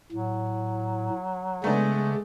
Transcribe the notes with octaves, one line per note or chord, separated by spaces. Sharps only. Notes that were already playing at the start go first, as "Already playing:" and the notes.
A2 F#3
C#3 G#3 A3 B3 D4